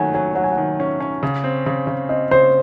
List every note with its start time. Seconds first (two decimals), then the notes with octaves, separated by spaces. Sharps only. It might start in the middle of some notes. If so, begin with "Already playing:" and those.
Already playing: D#3 F#3 A3 F#5 G#5
0.14 F#3 G#5
0.35 F#3 F#5
0.44 G#5
0.52 F#5
0.57 D#3
0.80 C#4
1.00 C#4
1.23 C#3
1.44 C4
1.66 C#3
1.87 C#3
2.09 C4 D#5
2.31 C#3 C5